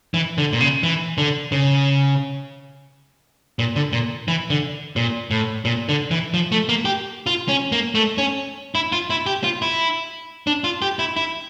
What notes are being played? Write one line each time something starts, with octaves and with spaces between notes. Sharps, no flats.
E3
D3
A#2
C#3
E3
D3
C#3
A#2
D3
A#2
E3
D3
A#2
A2
A#2
D3
E3
F3
A3
A#3
G4
F4
C#4
A#3
A3
C#4
E4
F4
E4
G4
F4
E4
D4
F4
G4
E4
E4